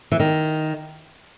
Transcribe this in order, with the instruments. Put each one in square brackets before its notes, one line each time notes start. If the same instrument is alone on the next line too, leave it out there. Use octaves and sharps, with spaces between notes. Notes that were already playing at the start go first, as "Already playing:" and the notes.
[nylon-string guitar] E3
D#3